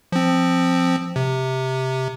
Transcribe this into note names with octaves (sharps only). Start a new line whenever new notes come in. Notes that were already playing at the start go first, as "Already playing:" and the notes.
F3 C4
C3